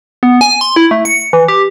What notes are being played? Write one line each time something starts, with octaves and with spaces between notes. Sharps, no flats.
B3
G#5
C6
E4
A3
C#7
E3
G4